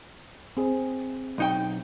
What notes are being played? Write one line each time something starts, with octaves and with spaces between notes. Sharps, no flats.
C4 G#4
B1 D#4 G5